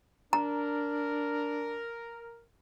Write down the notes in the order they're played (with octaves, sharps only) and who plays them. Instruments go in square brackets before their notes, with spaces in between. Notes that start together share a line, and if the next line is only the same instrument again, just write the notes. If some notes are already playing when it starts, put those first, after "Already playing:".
[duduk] D4 [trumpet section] A#4 [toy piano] A#5